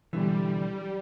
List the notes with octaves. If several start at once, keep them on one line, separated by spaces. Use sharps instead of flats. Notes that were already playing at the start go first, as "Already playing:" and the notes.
B2 D3 E3 G3